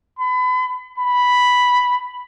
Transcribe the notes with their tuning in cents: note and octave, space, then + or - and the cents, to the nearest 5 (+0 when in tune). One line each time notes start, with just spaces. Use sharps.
B5 +35
B5 +0